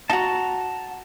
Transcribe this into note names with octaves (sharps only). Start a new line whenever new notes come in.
D#4 F#4 A5 A#5